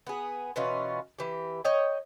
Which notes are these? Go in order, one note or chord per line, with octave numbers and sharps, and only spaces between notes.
B3 G#4
B2 E3 C#4 F4
E3 G4
C#5 D#5 G5